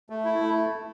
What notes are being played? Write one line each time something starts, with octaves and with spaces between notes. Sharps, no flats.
A3
E4
A3